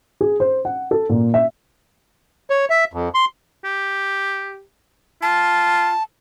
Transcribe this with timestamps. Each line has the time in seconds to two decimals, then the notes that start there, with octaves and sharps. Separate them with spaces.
0.21 G#4
0.40 C5
0.65 F#5
0.91 A4
1.09 A#2
1.34 E5
2.50 C#5
2.70 E5
2.94 F2
3.14 C6
3.65 G4
5.22 F4 A5